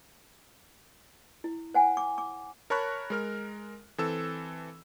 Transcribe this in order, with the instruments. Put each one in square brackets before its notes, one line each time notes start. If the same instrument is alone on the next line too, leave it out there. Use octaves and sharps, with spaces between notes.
[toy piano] E4
C5 F#5 G#5
D6
D6
[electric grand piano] A#4 C#5 A5 B5 C#6 F#6
G#3 A#4 F6
E3 C4 A4 E6